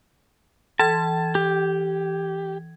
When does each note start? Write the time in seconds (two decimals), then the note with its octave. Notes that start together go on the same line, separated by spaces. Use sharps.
0.80 E3 A5 G#6
1.35 G4